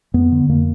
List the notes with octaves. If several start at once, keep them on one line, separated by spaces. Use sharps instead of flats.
F2 B3
D3
F2 A#3